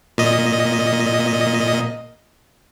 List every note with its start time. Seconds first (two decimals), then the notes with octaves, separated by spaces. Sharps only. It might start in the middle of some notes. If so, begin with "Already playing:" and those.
0.18 A#2 D#5